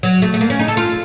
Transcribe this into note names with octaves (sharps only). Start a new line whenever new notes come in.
F#3
A3
A3
A#3
C#4
D#4
A4
F4